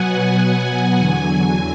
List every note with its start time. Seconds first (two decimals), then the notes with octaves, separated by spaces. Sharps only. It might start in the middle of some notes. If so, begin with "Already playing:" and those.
Already playing: B2 F#3 B3 F#5 G#5
0.22 G#5
0.96 E2 D3 F#3 G#5